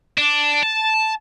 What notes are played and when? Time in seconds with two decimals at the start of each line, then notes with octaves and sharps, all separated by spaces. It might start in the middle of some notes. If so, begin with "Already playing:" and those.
0.18 D4
0.63 A5